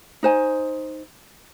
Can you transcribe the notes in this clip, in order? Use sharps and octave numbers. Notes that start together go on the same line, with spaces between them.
D#4 C5 G#5